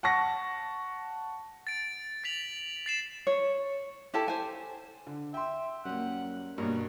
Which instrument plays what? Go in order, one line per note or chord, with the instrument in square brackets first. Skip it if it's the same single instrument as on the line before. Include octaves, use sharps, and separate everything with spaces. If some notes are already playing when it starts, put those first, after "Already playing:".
[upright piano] F#5 A5 C#6 A#6
[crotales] A6 D7
A6 B6 F7 F#7
A6 C7 E7
[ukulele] C#5
E4 G4 A4 A5
C5 G#5
[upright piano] D3
[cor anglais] E5 [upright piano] G5 C6
[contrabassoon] F#2 [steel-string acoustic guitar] G3 A#3 [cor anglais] F#5
[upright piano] G2 B2 [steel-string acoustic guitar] A#3 [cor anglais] C#4